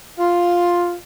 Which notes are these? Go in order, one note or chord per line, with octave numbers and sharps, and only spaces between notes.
F4